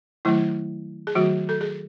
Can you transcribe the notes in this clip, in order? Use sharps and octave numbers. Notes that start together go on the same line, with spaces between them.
D#3 F#3 A3 E4
G#4
D#3 F#3 A3 F#4
A4
G#4